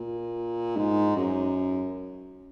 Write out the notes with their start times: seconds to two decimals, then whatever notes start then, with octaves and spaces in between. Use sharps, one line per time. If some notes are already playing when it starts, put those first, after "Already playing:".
Already playing: A#2
0.77 G#2
1.16 F#2